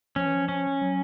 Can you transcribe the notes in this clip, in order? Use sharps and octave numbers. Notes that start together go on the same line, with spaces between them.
F3 C#4
E3
F3
C#4
F#3